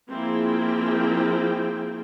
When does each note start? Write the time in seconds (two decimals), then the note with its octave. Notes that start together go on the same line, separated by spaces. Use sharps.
0.10 F3 A#3 C4 E4 G#4 G5